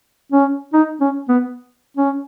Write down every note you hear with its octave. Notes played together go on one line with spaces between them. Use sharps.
C#4
D#4
C#4
B3
C#4